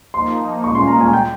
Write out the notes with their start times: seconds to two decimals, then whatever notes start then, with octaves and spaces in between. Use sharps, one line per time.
0.14 F3 A#3 D#4 C6
0.63 A#2 G#3 C#4 F4 C#6
0.75 C6
0.87 A#5
1.01 G#5
1.13 G5